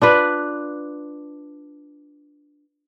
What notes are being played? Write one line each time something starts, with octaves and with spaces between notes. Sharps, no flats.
D4 F4 B4